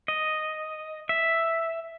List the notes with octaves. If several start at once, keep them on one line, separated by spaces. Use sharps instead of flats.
D#5
E5